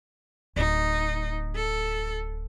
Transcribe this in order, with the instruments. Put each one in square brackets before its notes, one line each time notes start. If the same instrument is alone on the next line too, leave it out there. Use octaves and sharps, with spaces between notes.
[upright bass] D1 [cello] D#4
[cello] A4